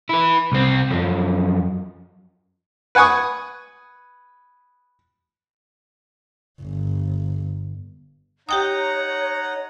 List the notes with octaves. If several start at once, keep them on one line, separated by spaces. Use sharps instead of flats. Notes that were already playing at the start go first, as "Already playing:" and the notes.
E4 B4
C2 C4
F#2 F3
B4 F#5 G#5 C#6 D#6
G1
D#4 G4 C#5 F#5 G5 A#5 D#6